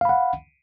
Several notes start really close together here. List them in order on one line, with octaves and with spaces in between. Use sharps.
F5 B5 F#5